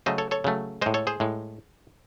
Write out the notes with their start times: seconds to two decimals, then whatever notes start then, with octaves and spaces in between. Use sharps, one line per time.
0.06 C#3 F#3 A3 C5 D#5
0.18 A4 C#5
0.31 A4 C#5
0.44 C#3 F#3 A3
0.82 A2 G#3 C5 D#5
0.94 A4 C#5
1.07 G#4 C5
1.20 A2 G#3